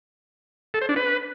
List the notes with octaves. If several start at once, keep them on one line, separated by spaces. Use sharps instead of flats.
A4
C5
D4
B4